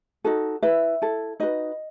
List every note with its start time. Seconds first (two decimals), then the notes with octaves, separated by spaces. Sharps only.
0.24 D#4 F#4 A4
0.62 E4 B4 E5
1.02 E4 A4
1.40 D#4 F#4 B4 D#5